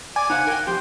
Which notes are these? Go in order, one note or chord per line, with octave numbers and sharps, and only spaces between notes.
D5 G#5
D#4 C5 F5 F#5
A#4 G5
F2 G4 C5